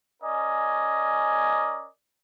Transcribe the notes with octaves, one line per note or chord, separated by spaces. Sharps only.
C#4 A#4 D5 D#5 G#5